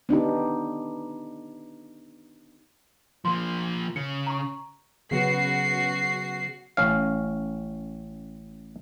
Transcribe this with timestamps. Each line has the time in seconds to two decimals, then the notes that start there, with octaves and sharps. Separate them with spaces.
0.09 B3 D4 D#4 G4
3.25 F3 A#3 C6
3.96 C#3 C#7
4.27 A#5 C#6
5.11 C#3 F#3 B3 F#4 C7
6.77 A1 C#4 F5